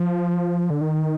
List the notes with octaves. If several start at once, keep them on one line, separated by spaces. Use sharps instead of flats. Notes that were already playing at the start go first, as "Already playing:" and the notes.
Already playing: F3
D3
D#3